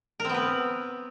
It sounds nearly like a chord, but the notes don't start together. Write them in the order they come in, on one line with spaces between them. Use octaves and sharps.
A#4 C4 B3 B4